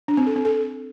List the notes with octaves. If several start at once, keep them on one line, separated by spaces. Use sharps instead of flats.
D4
C4
A4
C4
A4